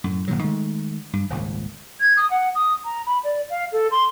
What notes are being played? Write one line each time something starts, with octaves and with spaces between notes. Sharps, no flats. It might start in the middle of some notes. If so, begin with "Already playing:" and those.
F#2 A2
G1 A#2 D#3 F#3
D#3 G#3 A3
G2
D#1 G#1 C#2 A#2
G#6
D#6
F#5
D#6
A#5
B5
D5
F5
A4
C6